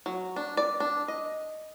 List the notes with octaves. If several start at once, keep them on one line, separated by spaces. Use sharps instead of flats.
F#3
D4
D5
D4
D#5